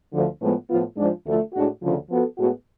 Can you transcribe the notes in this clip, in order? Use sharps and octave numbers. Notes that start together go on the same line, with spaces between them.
D2 D3 F3
A2 F3 G#3 B3
A2 F3 B3 F4
G#2 F3 G#3 D4
D2 D3 F3 A3
A2 G#3 D4 F#4
D2 C#3 F3
F3 B3 F#4 A4
A2 G#3 B3 F#4